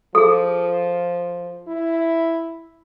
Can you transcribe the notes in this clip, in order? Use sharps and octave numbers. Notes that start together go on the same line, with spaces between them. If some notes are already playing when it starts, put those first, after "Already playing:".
F3 G#4 A4
E4